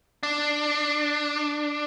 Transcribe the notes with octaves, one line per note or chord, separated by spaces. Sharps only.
D4